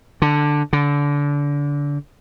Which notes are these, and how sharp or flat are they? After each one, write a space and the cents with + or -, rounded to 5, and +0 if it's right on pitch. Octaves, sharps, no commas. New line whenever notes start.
D3 +5
D3 -25